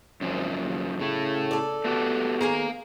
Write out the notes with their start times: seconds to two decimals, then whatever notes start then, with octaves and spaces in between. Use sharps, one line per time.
0.21 G#1 F#2 C#3 F3
0.61 D#2
1.00 A2 C#3 A3 E4
1.51 A4 D5
1.85 A3 B3 F#4 G4
2.41 D#3 G#4 F5 G#5 A#5